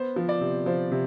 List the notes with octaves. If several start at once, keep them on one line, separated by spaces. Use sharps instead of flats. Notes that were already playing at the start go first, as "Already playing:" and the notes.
Already playing: B3 C5
F3
D5
C3
F3 C5
C3